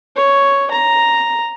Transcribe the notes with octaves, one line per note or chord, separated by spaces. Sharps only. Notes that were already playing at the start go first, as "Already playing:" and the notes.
C#5
A#5